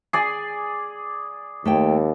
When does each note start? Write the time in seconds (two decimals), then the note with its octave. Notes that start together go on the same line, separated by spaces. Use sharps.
0.13 G#4 D5
1.65 D#2 A3 C#5 G5